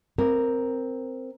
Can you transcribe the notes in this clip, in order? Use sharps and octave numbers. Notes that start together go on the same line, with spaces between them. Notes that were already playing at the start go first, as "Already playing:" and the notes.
C4 A#4